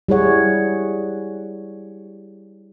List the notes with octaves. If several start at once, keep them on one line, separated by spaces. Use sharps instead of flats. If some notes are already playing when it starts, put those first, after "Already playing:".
G3 E4 G#4 C#5 F#5